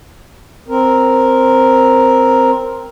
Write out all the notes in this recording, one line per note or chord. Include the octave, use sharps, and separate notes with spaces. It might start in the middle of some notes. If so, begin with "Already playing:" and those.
C4 A#4